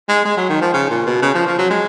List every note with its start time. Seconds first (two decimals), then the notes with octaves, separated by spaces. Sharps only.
0.09 G#3
0.25 G#3
0.37 F#3
0.49 D#3
0.61 F3
0.74 C#3
0.90 A#2
1.06 B2
1.22 C#3
1.35 F3
1.47 F3
1.58 F#3
1.71 G#3